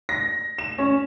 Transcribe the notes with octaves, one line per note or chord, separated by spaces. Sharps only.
A#6
E7
C#4